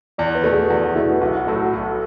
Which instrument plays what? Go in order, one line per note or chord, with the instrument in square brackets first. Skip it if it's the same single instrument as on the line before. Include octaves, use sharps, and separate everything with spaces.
[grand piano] E2 [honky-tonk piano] D5
[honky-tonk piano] B4
[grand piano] B2 A3
[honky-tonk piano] G#4
[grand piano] E2 [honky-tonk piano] F#4
[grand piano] B2 A3 [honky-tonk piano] E4
[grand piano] B1 [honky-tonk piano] F#4
[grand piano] A2 F#3 A3 [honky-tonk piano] A4
[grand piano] B1